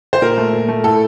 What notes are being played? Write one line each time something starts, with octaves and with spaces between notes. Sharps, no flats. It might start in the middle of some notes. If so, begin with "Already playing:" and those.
C5
A#2 A#4
A3
A#2
A3
A2 A4